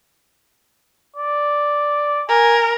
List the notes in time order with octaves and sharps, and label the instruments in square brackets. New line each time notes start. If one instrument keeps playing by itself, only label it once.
[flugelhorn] D5
[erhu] A#4 [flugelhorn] G#5